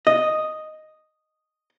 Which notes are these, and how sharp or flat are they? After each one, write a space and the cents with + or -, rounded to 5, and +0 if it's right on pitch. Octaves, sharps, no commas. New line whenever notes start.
D#5 +0